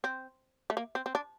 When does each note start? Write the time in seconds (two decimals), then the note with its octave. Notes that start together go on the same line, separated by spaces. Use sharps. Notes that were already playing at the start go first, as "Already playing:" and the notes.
0.04 C4
0.70 A3
0.77 A#3
0.95 C4
1.06 C4
1.15 D4